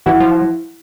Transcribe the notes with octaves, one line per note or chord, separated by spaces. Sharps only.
E3 E4 F#4
F3